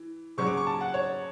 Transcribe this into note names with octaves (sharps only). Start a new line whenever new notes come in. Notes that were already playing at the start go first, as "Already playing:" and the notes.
Already playing: E3
C#3 F#3 C#4 C#6
D6
C#6
A5
F#5
C#5